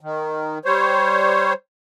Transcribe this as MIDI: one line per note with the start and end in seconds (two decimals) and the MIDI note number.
0.01 0.58 51
0.65 1.53 55
0.65 1.53 72
0.65 1.53 73